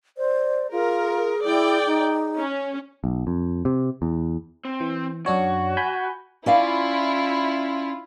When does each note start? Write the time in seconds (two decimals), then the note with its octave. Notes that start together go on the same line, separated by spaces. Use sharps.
0.17 C5 D5
0.72 F4 G#4 A#4
1.45 E4 D5 G5
1.86 D#4
2.38 C#4
3.04 B1
3.27 F2
3.65 C3
4.02 E2
4.65 C4
4.80 E3
5.26 F#2 D4 F#4 C#5
5.77 G#5 B5 G6
6.46 C#4 E4 F4 D5 F5